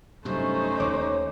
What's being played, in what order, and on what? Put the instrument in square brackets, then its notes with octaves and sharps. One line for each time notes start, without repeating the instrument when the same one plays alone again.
[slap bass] G2 C3 F#3 [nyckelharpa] A3 C#4 [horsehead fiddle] D#4 C5
[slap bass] D#2 [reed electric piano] C#5 D6